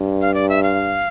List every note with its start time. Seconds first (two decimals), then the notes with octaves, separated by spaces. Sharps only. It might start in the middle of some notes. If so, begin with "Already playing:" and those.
Already playing: G2
0.21 F5
0.34 D5
0.49 E5
0.63 F5